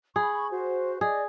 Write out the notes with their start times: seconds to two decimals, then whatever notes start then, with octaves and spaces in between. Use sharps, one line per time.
0.16 G#4 B5 C#6
0.50 F#4 C5
1.01 G#4 D5 D#5